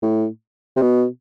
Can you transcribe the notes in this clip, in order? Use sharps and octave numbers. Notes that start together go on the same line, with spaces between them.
A2
C3
B2